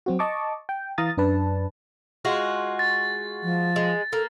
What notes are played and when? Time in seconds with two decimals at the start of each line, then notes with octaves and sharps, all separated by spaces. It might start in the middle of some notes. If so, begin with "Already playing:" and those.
0.06 F#3 C4 F#4
0.19 D#5 A5 C#6 D6
0.69 G5
0.98 E3 F5 A#5 D#6 A6
1.17 F#2 D4 B4 A5
2.25 G#3 F4 F#4
2.79 A6
3.43 F3
3.76 G#3
4.13 A#3 A4